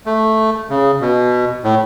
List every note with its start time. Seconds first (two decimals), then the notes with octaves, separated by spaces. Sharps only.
0.06 A3
0.69 C#3
1.01 B2
1.64 A2